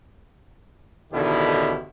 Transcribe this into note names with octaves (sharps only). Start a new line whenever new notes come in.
A1 B2 D3 D#3 E4 G4